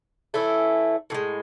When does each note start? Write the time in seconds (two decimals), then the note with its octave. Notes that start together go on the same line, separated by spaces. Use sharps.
0.34 E3 A3 C#4 E4
1.10 A2 E3
1.14 G#3